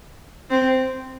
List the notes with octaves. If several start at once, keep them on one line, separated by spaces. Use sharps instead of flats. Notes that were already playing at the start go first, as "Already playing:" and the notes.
C4